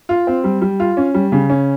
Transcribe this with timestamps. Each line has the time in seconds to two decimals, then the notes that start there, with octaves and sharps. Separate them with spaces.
0.09 F4
0.27 C4
0.44 G3
0.62 G3
0.80 F4
0.97 C#4
1.14 G3
1.32 C#3
1.50 C#4